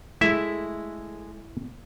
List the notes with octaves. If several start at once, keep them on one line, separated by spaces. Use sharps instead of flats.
G#3 A3 E4 E5